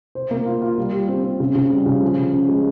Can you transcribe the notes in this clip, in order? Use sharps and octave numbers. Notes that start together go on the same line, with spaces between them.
C5
A#3
F4
F4
G3
G3
C4
C4
C#3
C#3
G3
C#3
F3
F3
C#4
G#3